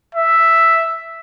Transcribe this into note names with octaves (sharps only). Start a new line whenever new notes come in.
E5